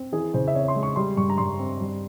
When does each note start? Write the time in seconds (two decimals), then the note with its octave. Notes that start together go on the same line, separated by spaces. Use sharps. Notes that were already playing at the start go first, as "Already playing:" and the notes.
Already playing: C4
0.12 E3 G#4
0.34 C#3 C5
0.47 E5
0.55 C4 C#5
0.68 C6
0.76 G#3
0.83 C#6
0.96 G3 C6
1.17 G2 C#6
1.30 A#5
1.38 G2 C6
1.59 C4
1.81 G3